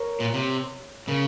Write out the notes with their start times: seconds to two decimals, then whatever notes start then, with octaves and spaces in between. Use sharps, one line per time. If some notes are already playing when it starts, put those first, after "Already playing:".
Already playing: A#4 C#5
0.19 A#2 B4
0.34 C3
1.07 C#3 A#4